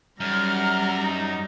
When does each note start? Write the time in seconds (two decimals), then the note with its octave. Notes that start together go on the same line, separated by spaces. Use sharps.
0.20 F#2 A2 G3 D#4 A#5 F6
1.01 D#4